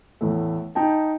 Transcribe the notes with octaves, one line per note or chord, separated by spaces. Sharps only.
E2 A2 A3
D#4 G5 A5